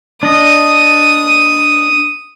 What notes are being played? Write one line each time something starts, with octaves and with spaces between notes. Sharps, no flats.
D4 D#5 D#6